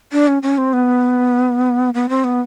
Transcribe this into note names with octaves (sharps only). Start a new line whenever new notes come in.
D4
C#4
C#4
C4
B3
B3
C4
B3